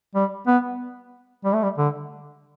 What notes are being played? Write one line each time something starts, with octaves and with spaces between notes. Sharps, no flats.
G3
B3
G3
A3
G3
D3